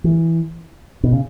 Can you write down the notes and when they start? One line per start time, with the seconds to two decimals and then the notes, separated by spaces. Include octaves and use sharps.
0.04 E3
1.03 B2
1.13 C#3